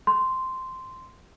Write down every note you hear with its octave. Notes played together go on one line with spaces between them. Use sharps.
C6